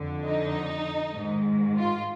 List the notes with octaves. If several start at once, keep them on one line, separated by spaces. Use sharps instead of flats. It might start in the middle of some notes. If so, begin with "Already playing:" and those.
Already playing: F2 D3
D#4
G#2 D#3
F4